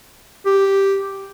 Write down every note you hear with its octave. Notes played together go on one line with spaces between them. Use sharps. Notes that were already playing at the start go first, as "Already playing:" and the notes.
G4